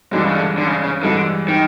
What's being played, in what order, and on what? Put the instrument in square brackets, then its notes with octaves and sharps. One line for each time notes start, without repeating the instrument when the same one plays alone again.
[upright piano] G2 E3 G#3 [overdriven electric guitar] D3
[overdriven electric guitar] C#3
D3
D3
C#3
C#3
[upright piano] G2 E3 G#3 [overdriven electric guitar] D3
[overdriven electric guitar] D#3